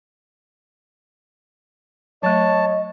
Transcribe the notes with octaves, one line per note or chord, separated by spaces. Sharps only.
F#3 A3 C#5 D#5 A5